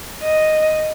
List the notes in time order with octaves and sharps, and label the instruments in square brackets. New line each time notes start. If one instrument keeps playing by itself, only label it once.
[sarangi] D#5